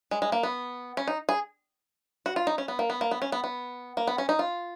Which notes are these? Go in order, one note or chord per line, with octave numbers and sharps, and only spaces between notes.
G#3
G#3
A#3
B3
C#4
D#4
G#4
F#4
F4
D#4
C#4
B3
A#3
B3
A#3
B3
C#4
B3
B3
A#3
B3
C#4
D#4
F4